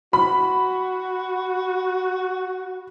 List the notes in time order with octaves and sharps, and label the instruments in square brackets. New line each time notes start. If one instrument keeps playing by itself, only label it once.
[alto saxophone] F#4 [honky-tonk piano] B5